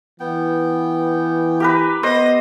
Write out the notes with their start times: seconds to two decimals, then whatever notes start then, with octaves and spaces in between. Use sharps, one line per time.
0.20 E3 B3 G5
1.60 G4 A#4 B4
2.03 B3 C5 D#5